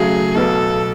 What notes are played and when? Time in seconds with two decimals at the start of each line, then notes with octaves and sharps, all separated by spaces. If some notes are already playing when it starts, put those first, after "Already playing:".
Already playing: C#3 F#3 A3 G#4
0.35 B1 B2 F#3 B3 A4